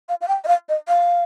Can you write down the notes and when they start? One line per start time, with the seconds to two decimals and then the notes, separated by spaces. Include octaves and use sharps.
0.09 F5
0.21 F5
0.28 G5
0.45 D#5
0.48 F5
0.69 D#5
0.88 F5